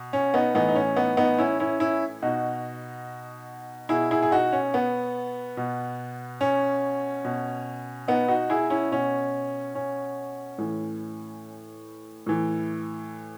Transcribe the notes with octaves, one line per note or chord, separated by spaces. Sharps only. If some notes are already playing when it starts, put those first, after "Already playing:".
Already playing: B2
C#4
B3 D#4
A2 E3 B3 D#4
D#4
C#4
B3 D#4
B3 D#4
C#4 E4
C#4 E4
C#4 E4
B2 D#4 F#4
B2 E4 G#4
E4 G#4
G#4
D#4 F#4
C#4
B3
B2
C#4
B2
B3 D#4
D#4 F#4
E4 G#4
C#4 E4
B2 C#4
C#4
A2 E3
A2 E3